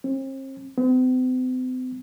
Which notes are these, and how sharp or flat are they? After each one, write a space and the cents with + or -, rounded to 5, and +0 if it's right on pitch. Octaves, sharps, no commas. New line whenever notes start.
C4 +40
C4 -45